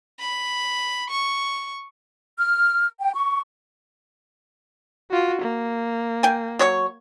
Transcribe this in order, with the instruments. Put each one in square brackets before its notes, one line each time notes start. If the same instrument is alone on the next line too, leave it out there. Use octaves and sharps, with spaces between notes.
[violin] B5
C#6
[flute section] F6
G5
C#6
[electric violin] F4 F#4
A#3
[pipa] G5 G#5
F#3 C#5 C#6